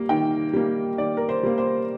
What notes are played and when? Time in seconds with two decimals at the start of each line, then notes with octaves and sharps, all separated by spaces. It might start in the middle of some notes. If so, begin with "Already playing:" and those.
Already playing: G3 A#3
0.09 D#3 G5
0.53 G3 A#3
0.98 D#3 D5
1.17 A#4
1.29 C5
1.43 G3 A#3
1.58 C5